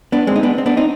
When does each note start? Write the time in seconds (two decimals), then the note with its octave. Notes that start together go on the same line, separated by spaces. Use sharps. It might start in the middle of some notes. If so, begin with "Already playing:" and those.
0.12 B3 D4
0.27 G#3 C4
0.36 D#4
0.43 B3 D4
0.58 C4
0.66 B3 D4
0.77 C4 D#4